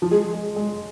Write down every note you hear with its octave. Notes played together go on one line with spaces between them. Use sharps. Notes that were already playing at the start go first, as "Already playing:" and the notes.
F3
G#3 G#4
G#3
G#3